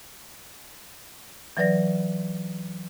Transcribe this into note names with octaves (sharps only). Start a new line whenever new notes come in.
E3 F#3 B4 D5 A#6